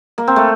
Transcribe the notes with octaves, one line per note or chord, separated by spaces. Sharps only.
A#3
C4
A3